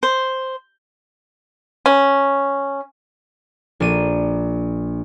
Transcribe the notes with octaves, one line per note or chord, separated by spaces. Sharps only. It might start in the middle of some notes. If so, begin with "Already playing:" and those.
C5
C#4
A#1 D4 D#7